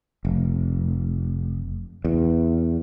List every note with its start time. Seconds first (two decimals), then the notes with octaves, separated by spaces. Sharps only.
0.25 F1
2.05 E2